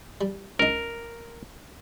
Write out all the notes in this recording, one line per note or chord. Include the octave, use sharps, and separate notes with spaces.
G3
C#2 D#4 A#4